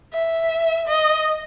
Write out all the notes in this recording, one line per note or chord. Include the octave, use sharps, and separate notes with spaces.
E5
D#5